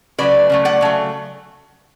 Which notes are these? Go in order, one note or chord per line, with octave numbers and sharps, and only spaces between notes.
C#3 F#3 A3 B4 D5
C#3 F#3 A3
D5 F#5
C#3 F#3 A3